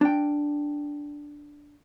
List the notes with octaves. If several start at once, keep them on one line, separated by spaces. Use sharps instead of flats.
D4 G5